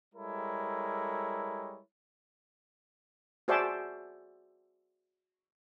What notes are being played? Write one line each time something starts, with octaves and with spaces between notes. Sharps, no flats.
G3 G#3 E4 A4 A#4 C#5
F#4 G#4 C5 D5 E5 A5